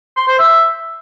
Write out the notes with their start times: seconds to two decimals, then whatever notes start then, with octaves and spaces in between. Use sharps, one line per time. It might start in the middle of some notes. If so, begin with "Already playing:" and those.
0.17 C6
0.28 C5
0.39 E5